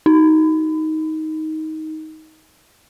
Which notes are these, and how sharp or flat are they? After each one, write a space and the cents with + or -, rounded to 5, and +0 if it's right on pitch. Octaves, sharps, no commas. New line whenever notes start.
D#4 +15